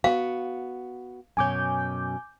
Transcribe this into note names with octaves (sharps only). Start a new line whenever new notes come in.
B3 F#4 F5
F#2 B2 C#5 G#5 D6 G6